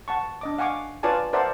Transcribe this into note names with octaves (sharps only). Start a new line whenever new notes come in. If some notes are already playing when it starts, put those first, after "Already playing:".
F#5 A5 C#6
D4 D#5 D6
F5 F#5 G#5 C#6 D6
F4 B4 C#5 D5 G#5 A5
A#4 C5 D5 E5 F#5 A5